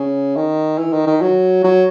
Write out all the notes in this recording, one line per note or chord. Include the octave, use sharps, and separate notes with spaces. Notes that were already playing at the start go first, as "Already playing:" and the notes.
Already playing: C#3
D#3
E3
D#3
D#3
F#3
F#3